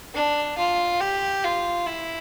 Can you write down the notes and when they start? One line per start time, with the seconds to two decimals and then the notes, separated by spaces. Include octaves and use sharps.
0.14 D4
0.58 F4
1.00 G4
1.44 F4
1.87 E4